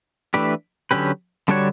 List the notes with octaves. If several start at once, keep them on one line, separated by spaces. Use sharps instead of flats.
E3 A3 D4 G4 B4
D3 F#3 C#4 G4 B4
D3 G3 D4 F#4 C#5